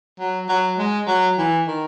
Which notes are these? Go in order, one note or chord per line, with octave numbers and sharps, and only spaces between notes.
F#3
F#3
G#3
F#3
E3
D#3